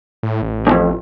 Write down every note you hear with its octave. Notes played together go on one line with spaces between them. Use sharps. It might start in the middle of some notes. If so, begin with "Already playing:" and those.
A2
A1
B1 F2